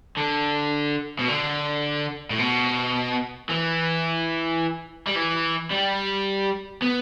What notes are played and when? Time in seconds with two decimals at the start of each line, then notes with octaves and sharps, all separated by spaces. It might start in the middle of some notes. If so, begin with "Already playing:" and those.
0.17 D3
1.19 B2
1.28 D3
2.30 A2
2.38 B2
3.50 E3
5.07 G3
5.16 E3
5.71 G3
6.82 B3